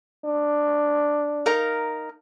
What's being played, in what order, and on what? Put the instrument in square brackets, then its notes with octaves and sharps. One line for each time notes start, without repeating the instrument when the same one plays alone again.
[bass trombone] D4
[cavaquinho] D#4 A#4 F5